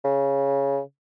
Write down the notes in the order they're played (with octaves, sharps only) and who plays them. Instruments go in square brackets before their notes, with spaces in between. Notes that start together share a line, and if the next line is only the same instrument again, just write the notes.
[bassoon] C#3